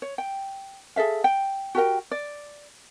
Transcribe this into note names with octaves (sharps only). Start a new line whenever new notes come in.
C#5
G5
G#4 A4 E5 F5
G5
F#4 G4 A#4 G5
D5